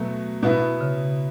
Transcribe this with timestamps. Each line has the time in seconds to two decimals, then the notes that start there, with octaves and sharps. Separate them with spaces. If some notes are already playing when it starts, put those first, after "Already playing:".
Already playing: B2 F#3 A3
0.43 B2 B3 E4
0.81 C#3